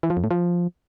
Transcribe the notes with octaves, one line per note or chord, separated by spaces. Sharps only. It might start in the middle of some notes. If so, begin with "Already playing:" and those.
E3
F3
F2
A2
F3